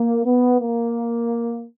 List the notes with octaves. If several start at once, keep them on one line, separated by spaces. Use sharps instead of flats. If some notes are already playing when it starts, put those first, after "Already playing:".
Already playing: A#3
B3
A#3